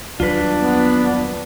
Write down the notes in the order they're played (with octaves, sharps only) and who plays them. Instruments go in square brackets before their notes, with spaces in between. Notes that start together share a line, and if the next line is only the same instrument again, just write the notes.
[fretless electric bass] D#2 F#3 G3 [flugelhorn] D4 [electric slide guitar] F4 B4
[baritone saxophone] B3